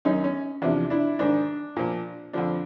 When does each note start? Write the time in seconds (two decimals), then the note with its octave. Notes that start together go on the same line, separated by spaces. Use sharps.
0.05 F#2 D#3 C#4 D#4
0.24 C#4
0.62 E2 C3 F3 D4
0.90 D4 E4
1.19 G#2 D#3 D4
1.76 A#2 F3
2.33 F2 D3 F3 D4